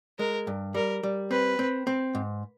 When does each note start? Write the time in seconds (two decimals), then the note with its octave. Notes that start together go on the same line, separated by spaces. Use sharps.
0.19 G#3 A#4
0.47 G2
0.74 G3 A#4
1.03 G3
1.31 C4 B4
1.59 C4
1.87 C4
2.15 G#2